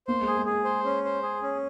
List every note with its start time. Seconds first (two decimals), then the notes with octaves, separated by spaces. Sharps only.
0.07 A#3 C5
0.21 G#3
0.27 G#4
0.37 G#3
0.46 G#4
0.51 G#3
0.65 C5
0.85 C#4
1.04 C5
1.23 G#4
1.43 C#4